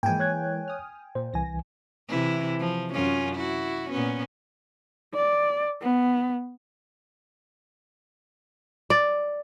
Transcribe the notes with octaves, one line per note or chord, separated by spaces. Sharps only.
G#2 E3 F3 G#3 A#3 G5 G#5
C#5 F#6 G#6
D#6 F6
A#2 C5
C2 E3 G#5 A#6
C3 E3 E4
F3
F#2 C#4 F4
E4 F#4
A#2 B3 C#4
D5
B3
D5